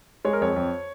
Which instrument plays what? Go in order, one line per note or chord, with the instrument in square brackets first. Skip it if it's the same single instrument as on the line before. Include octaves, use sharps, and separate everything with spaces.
[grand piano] G#3 C#5
A#4
F2 C#5
F2